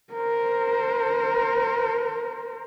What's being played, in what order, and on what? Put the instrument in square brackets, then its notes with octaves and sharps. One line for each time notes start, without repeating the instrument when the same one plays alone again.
[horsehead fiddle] A#4 C5